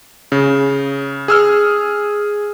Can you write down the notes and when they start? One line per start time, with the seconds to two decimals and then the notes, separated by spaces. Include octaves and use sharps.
0.32 C#3
1.28 G#4 E6 F6